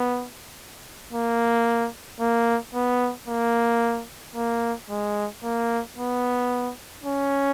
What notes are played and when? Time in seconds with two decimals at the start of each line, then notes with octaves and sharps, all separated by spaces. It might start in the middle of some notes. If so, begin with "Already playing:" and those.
Already playing: B3
1.13 A#3
2.20 A#3
2.75 B3
3.28 A#3
4.36 A#3
4.90 G#3
5.43 A#3
5.97 B3
7.04 C#4